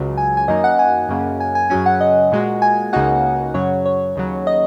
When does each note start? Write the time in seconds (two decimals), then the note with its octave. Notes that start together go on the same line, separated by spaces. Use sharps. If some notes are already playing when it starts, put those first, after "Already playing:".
Already playing: C#2 C#3 F#3
0.17 G#5
0.37 G#5
0.48 F#2 D#3 F#3 A#3 D#4 D#5
0.64 F#5
0.79 G#5
1.09 F#2 C#3 A#3
1.41 G#5
1.55 G#5
1.70 F#2 C#3 F#3 C#4 G#5
1.86 F#5
2.01 D#5
2.32 A#2 G#3 F#4
2.62 G#5
2.93 C#2 C#3 A#3 D#4 F#4 F#5
3.54 F#2 C#3 F#3 C#5
3.86 C#5
4.16 D#2 C#3 F#3
4.47 D#5